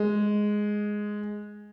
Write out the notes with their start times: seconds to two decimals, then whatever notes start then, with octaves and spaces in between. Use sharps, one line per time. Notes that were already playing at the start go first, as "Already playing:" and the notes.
Already playing: G#3